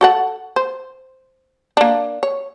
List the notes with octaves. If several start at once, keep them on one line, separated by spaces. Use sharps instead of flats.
F#4 A4 F#5
C5
A#3 D4
C#5